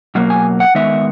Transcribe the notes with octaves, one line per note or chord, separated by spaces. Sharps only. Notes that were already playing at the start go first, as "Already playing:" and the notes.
B2 F#3 A#3
G#5
F#5
D#3 G#3 B3 D#4 E5